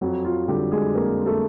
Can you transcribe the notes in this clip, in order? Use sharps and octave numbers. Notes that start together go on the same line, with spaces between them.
F2 F#3 F#4
F4
D3 G3 G4
G#3 G#4
F2 A#3 A#4
A3 A4